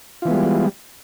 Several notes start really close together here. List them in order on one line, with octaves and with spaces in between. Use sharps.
F4 E3 B3 G#3 G3